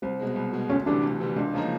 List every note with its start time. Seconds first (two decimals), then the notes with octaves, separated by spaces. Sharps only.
0.02 C2 C4
0.20 B2 G#3
0.36 C2
0.53 B2 G#3
0.70 D2 C#4
0.86 C3 E3 G3 D4
1.03 D2
1.20 C3 E3 G3
1.36 C#2 D4
1.54 C#3 F3 A#3 D#4